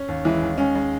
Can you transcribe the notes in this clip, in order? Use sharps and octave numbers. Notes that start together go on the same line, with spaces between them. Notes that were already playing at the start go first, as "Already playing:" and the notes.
Already playing: C#4
D#2
E3 G#3
D#2
G#3 C#4
G#3